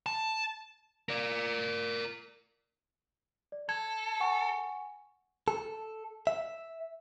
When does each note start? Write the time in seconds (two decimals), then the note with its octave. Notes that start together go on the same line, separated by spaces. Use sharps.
0.06 A5
1.08 A#4 D5
3.52 D5
3.69 A4 G#6
4.20 F#5 G#5 C#6
5.48 A4
6.27 E5